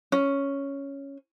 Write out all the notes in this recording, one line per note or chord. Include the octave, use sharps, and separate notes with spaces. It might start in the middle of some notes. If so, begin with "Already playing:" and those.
C#4